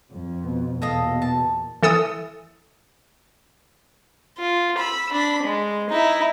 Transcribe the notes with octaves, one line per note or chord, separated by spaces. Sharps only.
F2
B2
E2 A#2 A4 D#5 F5
A5
E3 A4 D#6 E6
F4
B5 E6
D4 B5
G#3
D#4 E4